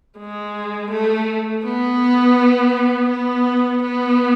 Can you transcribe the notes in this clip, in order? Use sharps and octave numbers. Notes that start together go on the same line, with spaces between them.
G#3
A3
B3
B3
B3